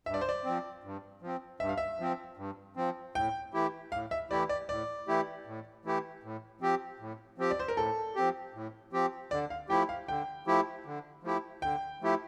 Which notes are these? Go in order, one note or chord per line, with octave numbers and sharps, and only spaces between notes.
G2 E5
D5
C5
D5
F3 C4
G2
F3 C4
G2 E5
F5
E5
F3 C4
G2
F3 C4
A2 G5
E3 A3 E4 G4
A2 F5
E5
E3 A3 E4 G4 D5
D5
A2 D5
E3 A3 E4 G4
A2
E3 A3 E4 G4
A2
F3 C4 G4
A2
F3 C4 G4
D5
C5
A#4
A2 A4
F3 C4 G4
A2
F3 C4 G4
D3 D5
F5
F3 A3 E4 G4 G5
F5
D3 G5
F3 A3 E4 G4
D3
F3 A3 E4 G4
D3 G5
F3 A3 E4 G4